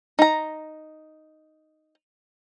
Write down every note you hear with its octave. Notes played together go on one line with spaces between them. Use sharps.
D#4 A#5